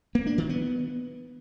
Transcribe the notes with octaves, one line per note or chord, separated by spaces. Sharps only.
A#3
D4
D#3
B3